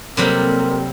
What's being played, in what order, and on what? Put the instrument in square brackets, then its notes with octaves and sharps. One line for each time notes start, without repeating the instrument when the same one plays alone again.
[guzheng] C3 F#3 G3 [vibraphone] A#3 C4 A4 [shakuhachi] A#4